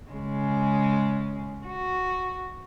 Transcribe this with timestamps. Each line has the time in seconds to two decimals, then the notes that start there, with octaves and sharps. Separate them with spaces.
0.11 C#3 G#3
1.66 F#4